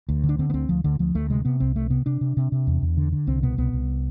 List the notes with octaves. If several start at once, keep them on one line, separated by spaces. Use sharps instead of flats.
D2
D3
D4
D3 C4
B3
D2 C4
D2 F3
D2 D3
D2 F3
D2 A3
C3 G#3
C3 B3
C2 C4
C3 A3
C3 B3
C3 D4
C3
C3
C3
E2
E2
D3
D3
C2 C4
B2 B3
C2 B3
C2